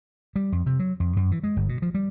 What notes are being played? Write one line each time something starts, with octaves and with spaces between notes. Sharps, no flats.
G3
F2
C3
F#3
F2
F#2
E3
G#3
G1
B2
F3
G3